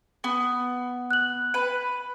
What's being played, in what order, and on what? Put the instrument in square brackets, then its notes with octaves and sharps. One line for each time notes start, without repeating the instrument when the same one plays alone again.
[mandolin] B3
[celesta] F#6 F#7
[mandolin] B4